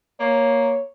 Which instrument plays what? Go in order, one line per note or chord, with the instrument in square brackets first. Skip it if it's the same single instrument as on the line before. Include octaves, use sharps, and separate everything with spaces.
[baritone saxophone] A#3 [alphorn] C#5